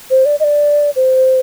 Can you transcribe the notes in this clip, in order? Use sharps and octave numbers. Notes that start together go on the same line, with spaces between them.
C5
D5
D#5
D5
C5